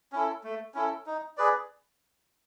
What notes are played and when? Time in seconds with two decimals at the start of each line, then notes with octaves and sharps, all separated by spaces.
0.12 C#4 E4 A4
0.44 A3
0.74 C#4 E4 A4
1.06 D#4
1.37 G#4 B4 D5